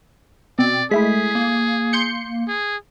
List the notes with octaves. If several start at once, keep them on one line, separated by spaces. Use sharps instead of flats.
B2 C4 D5
G#3 A3 E4 G#4 B6
A#3
C6 G6 C#7
G#4